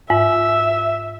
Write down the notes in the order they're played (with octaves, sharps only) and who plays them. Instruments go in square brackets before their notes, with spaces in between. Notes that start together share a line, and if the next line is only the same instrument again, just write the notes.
[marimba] G#2 [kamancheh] E5